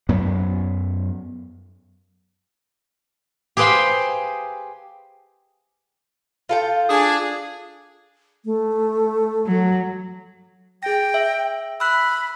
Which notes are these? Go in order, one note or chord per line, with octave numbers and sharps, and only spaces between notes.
F#2 F#3 B3
G4 G#4 B4 C5 F5 G5
F4 A4 G5
D4 G#4
A3
F#3
G#4 G5 A#6
E5
B5 E6 F#6